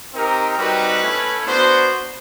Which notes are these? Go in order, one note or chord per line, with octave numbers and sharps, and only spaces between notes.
C4 D#4 G4 A#4
G3 C4 D#4 F#4 B4
A3 C#4 E4
B3 D4 F#4 C5